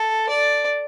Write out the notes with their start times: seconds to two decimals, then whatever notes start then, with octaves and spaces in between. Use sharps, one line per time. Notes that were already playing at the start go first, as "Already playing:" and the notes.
Already playing: A4
0.29 D5